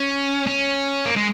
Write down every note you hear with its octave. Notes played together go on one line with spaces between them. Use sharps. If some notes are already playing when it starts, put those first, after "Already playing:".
Already playing: C#4
C#4
A#3
G#3